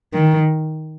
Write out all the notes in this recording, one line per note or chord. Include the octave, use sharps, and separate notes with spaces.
D#3